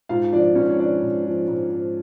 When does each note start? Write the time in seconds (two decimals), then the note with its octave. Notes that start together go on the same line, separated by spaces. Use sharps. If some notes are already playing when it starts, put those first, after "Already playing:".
0.09 G#2 F4 F5
0.32 F3 D4 D5
0.55 G#2 C#4 C#5
0.70 C#5
0.79 F3 D4 D5
1.02 G#2
1.26 F3
1.48 G#2
1.71 G#2